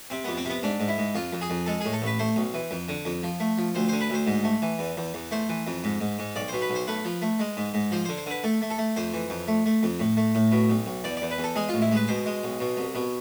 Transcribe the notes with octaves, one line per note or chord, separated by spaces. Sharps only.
C3 C4
F2 B3
C4
C3 B3
G#2 D4
G#2
E4
G#2
F2 F4
F2
G#4
F2
G#3 A4
A2 G#4
A4
A1 B4
A3 C5
B1
E3
F2
D3
F2
F3
A3
F3
D2 C5
D3 C5
B4
D2 C5
G#2
A3
E3
E2
E2
E2
A3 C5
E3
F2
G#2
G#2
G#2
B1 D5
B2 C5
B4
B1
C5
A3 B4
F3
A3
G#3
G#2
G#2
F3 C5
C5
D3
C5
D3 B4
A3 A4
A3
A4
A3
F2 C5
E3
F2
A3
A3
F2
A2
A3
A2
B2
B1
B1
E2 D5
D5
E2
B4
E2
A4
G#3 G#4
F4
A1
E4
G#3 B4
B2 C5
G#3
B1
B2
C2
B2